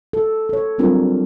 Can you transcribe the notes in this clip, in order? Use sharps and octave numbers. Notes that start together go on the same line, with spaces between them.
A4
A4 C#5
F#3 G3 C4 D4 F4 A#4